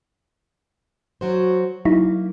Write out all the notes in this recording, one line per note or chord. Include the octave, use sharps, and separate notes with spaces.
F#3 F#4 C5
F#3 A#3 D#4 E4